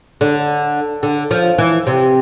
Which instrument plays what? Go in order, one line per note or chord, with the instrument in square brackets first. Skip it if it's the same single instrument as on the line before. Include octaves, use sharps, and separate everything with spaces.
[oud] D3
D3
F3
E3
C3